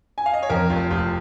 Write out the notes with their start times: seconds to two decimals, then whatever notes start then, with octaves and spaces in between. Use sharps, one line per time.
0.18 G#5
0.26 F5
0.34 D#5
0.43 C#5
0.50 F2 A#4
0.70 F1 F4
0.90 F1 F4